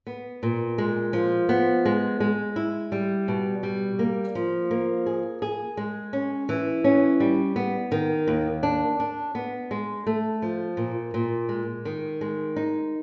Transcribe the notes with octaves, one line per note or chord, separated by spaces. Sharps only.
B3
A#2
G#3
F3
B3
G#3
G#3
E4
G3
B2
G3
A#3
F3
A#3
G#4
G#4
G#3
C#4
E3
C#4
G3
B3
D#3
D#2
D4
D4
B3
G#3
A3
F3
A#2
A#2
G#3
D#3
G#3
D#4